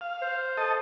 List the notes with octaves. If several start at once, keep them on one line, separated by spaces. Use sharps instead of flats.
F5
C5
A4 D#5